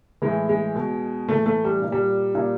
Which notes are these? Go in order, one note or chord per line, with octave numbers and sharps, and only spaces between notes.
A2 E3 G#3
G#3
B2
A2 E3 A3
A3
G3
A#2
G3
A#2